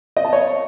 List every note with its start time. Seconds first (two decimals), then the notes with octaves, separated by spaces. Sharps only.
0.17 D#5
0.25 A5
0.33 C#5